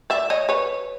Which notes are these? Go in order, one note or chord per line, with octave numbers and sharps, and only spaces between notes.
D5 E5
C#5 D#5
B4 C#5